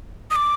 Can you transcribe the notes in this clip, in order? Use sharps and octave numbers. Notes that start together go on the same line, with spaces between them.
D#6
D6